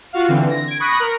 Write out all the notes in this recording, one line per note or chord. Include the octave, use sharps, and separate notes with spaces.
F4 F#4 F5
D3 E3 C4
A#6
G#6 D7
B5 C#6 D#6 F#6 A#6 B6
A#4